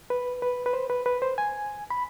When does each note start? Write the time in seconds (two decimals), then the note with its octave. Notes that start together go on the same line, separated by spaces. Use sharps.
0.10 B4
0.42 B4
0.66 B4
0.73 C5
0.90 B4
1.06 B4
1.22 C5
1.38 G#5
1.90 B5